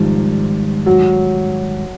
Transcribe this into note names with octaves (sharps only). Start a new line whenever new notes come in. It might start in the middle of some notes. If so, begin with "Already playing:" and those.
Already playing: G#2 D#3 F3 G3
F#3